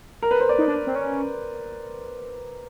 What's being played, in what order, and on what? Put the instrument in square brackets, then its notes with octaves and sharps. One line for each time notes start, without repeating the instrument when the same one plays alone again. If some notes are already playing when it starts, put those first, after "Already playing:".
[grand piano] A#4
B4
C5
D5
[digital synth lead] D#4
D4
C4
C#4